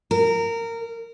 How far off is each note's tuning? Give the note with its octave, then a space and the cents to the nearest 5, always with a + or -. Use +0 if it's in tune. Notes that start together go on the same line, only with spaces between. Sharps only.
A#4 -20